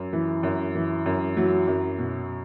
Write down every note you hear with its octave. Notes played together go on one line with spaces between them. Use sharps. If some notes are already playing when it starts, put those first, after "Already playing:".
Already playing: F#2
E3
F#2
E3
F#2
E3 F#3
F#2
B2